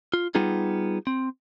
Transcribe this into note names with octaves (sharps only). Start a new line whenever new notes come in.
F4
G3 B3 D#4 F4 G#4
C4